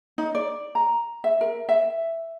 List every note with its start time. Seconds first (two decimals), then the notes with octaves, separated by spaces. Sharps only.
0.18 D#4
0.35 D5
0.75 A#5
1.24 E5
1.41 A#4
1.69 E5